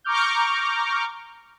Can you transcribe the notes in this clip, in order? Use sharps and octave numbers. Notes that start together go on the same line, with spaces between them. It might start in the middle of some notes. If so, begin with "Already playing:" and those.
A#5 C#6 D6 F6 G6